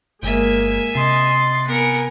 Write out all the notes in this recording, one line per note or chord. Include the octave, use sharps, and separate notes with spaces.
G1 G#3 A#3 E5 G#5
C3 D#5 C6 A6
B3 A#4 G#5 C#7